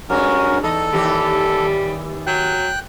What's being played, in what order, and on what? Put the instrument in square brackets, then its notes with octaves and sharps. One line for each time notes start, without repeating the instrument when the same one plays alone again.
[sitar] G2 G#3 [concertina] C#4 F#4 A#4
[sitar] E2 D#4 D#5 [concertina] A4
[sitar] D#2 E3 G4 [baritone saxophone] G3
[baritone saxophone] F#3 [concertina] G5 F#6